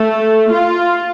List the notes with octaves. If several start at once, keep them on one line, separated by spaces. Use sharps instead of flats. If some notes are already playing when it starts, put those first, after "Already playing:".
Already playing: A3
F4